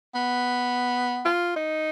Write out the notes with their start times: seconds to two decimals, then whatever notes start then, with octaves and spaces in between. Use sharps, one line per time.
0.12 B3
1.25 F4
1.54 D#4